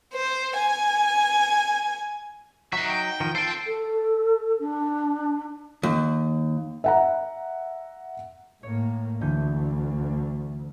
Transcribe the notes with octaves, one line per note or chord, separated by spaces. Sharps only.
C5
G#5
F#3 D#4 E5 F#5
G5
D#3 F3
F3 A4 C5 G5
A4
D4
D#2
E5 F#5 A#5
A2 A#3 C#5
D2 D3 E3 G6